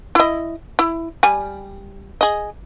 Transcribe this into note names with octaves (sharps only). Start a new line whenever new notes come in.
E4 D#5
E4
G3 G#5
G#4 D#5